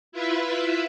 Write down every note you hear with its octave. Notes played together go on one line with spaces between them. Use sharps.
E4 F4 B4 E5